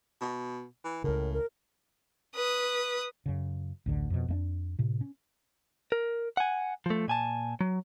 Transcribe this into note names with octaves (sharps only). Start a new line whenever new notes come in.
B2
E3
C#2 A2 C#3 A#4
A#4
B4 D#6
F#2 C#3
A1 D2 D3
F2 B2
F2 A3 D4
A2 C3
C#4
A#4
F#5 G#5
F3 A3
A#2 G#5 A5
F#3